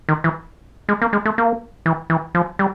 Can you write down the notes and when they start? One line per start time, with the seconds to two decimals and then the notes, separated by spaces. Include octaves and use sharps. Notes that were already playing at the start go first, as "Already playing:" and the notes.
0.09 D#3
0.24 E3
0.89 G#3
1.02 A#3
1.13 G#3
1.25 A3
1.38 A#3
1.86 E3
2.10 E3
2.35 F3
2.59 G3